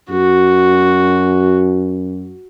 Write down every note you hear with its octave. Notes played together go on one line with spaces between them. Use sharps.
F#2 F#4